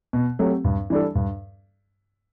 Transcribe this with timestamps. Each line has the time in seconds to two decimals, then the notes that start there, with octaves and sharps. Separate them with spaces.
0.13 B2
0.39 F#3 A3 C4 G4
0.64 G2
0.90 E3 G3 D4 A4
1.15 G2